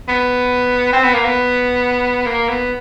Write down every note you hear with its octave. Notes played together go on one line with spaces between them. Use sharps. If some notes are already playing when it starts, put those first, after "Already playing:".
B3
C4
B3
A#3
B3
A#3
B3